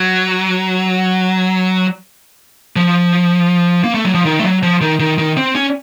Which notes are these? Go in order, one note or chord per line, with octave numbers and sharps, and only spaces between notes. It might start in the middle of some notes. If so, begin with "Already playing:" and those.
Already playing: F#3
F3
A#3
A3
F#3
F3
D#3
A3
F#3
F3
D#3
D#3
D#3
C4
C#4